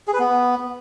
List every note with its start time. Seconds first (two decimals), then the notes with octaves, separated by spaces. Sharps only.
0.07 G#4
0.13 B4
0.19 B3